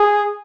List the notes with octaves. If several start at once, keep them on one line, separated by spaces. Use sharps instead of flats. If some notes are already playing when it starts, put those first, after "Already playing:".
Already playing: G#4